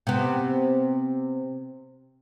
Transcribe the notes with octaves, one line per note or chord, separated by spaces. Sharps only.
C3 B3